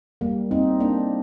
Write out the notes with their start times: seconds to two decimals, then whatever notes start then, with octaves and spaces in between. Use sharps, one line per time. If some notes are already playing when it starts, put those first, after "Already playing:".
0.21 G3 A#3
0.51 C4 D#4
0.80 A#3 D4